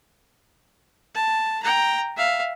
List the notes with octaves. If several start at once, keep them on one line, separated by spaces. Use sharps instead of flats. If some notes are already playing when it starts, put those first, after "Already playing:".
A5
G5 A#5
E5 F5